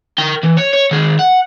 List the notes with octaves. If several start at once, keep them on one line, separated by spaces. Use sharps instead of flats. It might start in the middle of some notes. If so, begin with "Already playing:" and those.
A#4 G5
E3
C#5
C#5
D#3 G#4
F#5